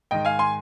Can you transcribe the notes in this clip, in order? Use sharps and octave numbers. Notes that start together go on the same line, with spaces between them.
G#2 D#3 D#5 G5
F5 G#5
G#5 C6